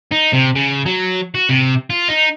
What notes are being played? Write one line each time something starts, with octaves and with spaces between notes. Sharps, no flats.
D#4
C3
C#3
F#3
F#4
C3
F4
D#4